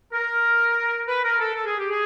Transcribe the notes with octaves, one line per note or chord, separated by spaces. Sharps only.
A#4
B4
A#4
A4
A4
G#4
G4
G#4